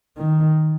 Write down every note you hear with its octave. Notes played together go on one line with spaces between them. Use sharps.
D#3